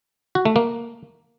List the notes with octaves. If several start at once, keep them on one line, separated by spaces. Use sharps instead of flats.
F#4
A3
A#3